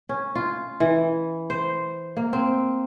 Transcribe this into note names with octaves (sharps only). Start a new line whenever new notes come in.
C#4
F4
E3
C5
A#3
C4